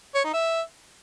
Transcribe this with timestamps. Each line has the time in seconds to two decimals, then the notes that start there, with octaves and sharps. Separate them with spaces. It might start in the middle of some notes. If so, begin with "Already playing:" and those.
0.15 C#5
0.24 D#4
0.33 E5